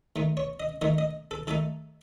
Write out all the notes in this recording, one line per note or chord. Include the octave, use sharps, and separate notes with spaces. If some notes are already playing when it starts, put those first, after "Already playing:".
D#3 A3 D#4
C#5
D#5
D#3 A3 D#4 D#5
D#5
A4
D#3 A3 D#4 A4